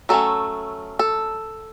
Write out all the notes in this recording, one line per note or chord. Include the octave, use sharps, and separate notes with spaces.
F#3 A3 C#4 A4
A4